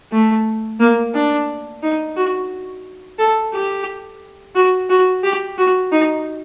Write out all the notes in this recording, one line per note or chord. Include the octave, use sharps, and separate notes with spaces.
A3
A#3
D4
D#4
F#4
A4
G4
F#4
F#4
G4
F#4
D#4